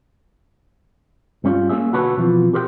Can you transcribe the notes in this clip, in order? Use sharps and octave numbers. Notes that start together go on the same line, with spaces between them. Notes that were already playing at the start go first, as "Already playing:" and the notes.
G2 G3 C#4 F4
A#3 C#4 G#4 E5
B1 D3 F#4 A4 B4 C#5
B2 E3 F3 C4
G4 A#4 C5 E5 G5